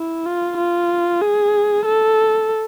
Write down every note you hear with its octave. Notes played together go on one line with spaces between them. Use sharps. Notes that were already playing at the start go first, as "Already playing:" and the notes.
Already playing: E4
F4
F4
G#4
A4